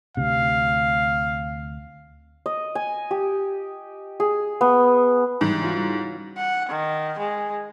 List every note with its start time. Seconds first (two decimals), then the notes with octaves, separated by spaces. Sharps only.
0.17 D2 C3 F5
2.46 D#5
2.75 G#5
3.11 G4
4.20 G#4
4.61 B3
5.41 G#2 E3 G3
5.62 C#4 F4 F#4
6.37 F#5
6.69 D#3
7.18 G#3